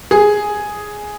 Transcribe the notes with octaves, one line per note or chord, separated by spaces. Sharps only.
G#4